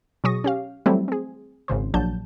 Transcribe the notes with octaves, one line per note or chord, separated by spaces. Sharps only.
B2 F#3 G#4 C#6 D#6 A#6
C#4 G4 F5
E3 F#3 G3 A3 C4 E4
C4 G#4
G#1 C#3 C5
A#1 F#3 D4 A5 G6